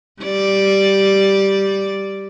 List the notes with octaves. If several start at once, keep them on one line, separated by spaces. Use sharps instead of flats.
G3 D5